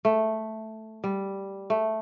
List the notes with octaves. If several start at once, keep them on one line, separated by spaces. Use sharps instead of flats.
A3
G3
A3